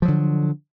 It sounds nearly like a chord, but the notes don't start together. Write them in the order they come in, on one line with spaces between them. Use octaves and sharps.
F3 F#3 D3